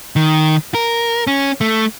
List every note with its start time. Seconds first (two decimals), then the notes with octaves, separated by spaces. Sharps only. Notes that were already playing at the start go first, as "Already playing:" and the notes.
0.16 D#3
0.74 A#4
1.27 C#4
1.61 A3